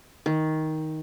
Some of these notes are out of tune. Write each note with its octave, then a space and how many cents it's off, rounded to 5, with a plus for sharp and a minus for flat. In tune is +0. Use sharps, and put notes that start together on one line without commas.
D#3 +10